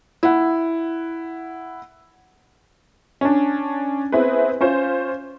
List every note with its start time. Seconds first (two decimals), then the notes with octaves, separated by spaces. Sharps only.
0.23 E4 F#5
3.21 C#4 D4
4.12 B3 C4 E4 G#4 B4
4.61 C#4 F4 C5